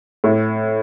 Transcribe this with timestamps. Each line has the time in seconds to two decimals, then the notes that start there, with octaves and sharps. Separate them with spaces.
0.24 A2